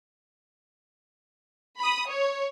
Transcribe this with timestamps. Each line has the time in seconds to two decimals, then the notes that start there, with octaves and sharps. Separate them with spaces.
1.78 B5 D#6
2.08 C#5